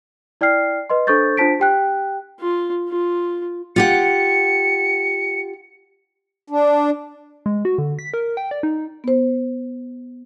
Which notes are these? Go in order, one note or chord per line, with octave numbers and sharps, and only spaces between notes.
E4 D5 G5 F6 C7
B4 D#5 C6
D4 A4 C5 C#6 G6 A6
D4 F4 C5 A5 B6 D7
G4 G5 F#6
F4
F4
F4 G4 F#5 C#7
D4
G#3
F#4
D3
B6
A#4
G5
D5
D#4
B3 C5